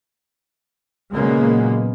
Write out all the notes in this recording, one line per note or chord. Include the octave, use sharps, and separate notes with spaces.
A#2 C#3 F#3 G#3 A#3 B3